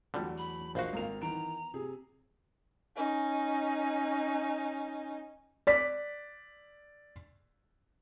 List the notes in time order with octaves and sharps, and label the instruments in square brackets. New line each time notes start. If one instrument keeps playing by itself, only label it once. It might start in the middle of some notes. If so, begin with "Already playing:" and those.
[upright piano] E2 F#3 A3 [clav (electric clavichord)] D3 G3
[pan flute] B5
[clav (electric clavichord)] A#1 F#4 [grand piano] C5 D5 D#5 [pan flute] F5
[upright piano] G#1 A#4 F7
[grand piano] D#3 E3 B3 [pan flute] A#5 [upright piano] D7
[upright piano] C3 [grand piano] G#4
[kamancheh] C#4 D#4
[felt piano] D5 B6